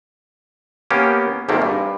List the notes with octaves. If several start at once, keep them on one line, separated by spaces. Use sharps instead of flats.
A#3 B3 C#4 G4
G#1 G#2 D#3 A3 A#3
G2